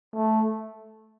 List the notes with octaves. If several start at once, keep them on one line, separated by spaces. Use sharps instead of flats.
A3